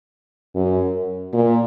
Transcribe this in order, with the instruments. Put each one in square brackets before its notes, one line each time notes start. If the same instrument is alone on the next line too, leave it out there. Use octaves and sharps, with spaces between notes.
[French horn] F#2
A#2